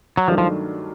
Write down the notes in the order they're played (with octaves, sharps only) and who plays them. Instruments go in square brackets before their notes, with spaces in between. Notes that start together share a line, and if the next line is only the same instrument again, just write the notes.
[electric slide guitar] F#3
[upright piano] G2 D#3 F#3 A3 D4 [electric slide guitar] F3
[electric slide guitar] F3